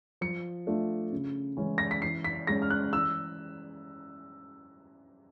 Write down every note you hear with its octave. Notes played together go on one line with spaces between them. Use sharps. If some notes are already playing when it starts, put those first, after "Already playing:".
F3 C#7
A3 D4 F4
C#3
E3 G#3 C#4 E4
A#6
B6
E3 C7
B6
G#3 C#4 A#6
F6
F#6
E3 E6